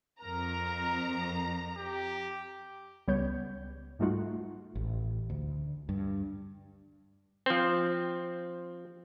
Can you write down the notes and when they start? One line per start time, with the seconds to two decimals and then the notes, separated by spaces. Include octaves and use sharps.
0.22 F2 A#4 A#5
1.77 G4
3.08 C#2 G3 B3 C#5 G6
3.99 G#2 G3 A3 D#4 F4 F#4
4.75 A1
5.30 D2
5.89 G2
7.46 F3 C4